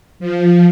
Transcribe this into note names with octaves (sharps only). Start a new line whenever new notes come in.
F3